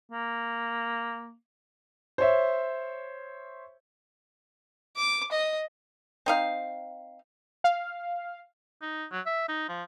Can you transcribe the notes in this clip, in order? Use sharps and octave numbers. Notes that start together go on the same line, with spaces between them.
A#3
C5 C#5 E5
D6
D#5
C4 D#4 F5
F5
D#4
F#3
E5
D#4
F3